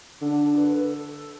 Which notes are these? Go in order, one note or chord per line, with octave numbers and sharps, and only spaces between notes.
D3 D4
D4
B4
A4